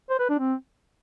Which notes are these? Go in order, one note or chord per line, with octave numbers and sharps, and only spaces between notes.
C5
B4
D4
C4